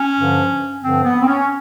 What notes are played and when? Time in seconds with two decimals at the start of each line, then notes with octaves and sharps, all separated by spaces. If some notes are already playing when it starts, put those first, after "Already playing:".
Already playing: C#4
0.16 G2 D3 F3
0.82 G2 D3 F3 C4
1.04 B3
1.21 C4
1.27 C#4